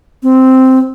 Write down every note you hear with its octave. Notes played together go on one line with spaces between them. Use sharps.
C4